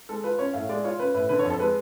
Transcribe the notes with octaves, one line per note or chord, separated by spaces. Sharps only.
G#3 A4
F4 B4
C#4 C#5
A2 F5
G#3 D5
F4 C#5
C#4 B4
A2 B4
D3 B4
C#5
F2 A4
G#3 B4